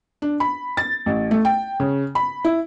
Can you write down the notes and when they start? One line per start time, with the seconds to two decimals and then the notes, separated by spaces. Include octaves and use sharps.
0.22 D4
0.40 B5
0.77 A6
1.06 A1
1.31 A3
1.45 G5
1.80 C#3
2.15 B5
2.45 E4